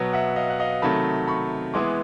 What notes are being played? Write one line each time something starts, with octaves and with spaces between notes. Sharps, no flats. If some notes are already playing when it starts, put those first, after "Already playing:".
Already playing: B2 F#3 B3
E5 F#5
D#5 F5
F#5
D#5 F5
C3 D#3 F#3 A3 A5 B5
B5 C#6
E3 G#3 B3 E4 C6 D6